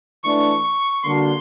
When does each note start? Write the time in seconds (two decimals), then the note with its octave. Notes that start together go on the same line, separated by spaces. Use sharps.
0.23 E3 A3 D4 C#6
1.03 D3 G3 A#3 D4 F#4 C6